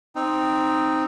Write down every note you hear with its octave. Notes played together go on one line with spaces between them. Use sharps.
C4 D#4